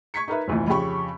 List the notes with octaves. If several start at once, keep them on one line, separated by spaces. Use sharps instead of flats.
C#6 G#6 B6 C#7
D#4 A#4 B4 E5
F1 D2 A#2 E3
F2 C#3 C#4 G4 B5 C#6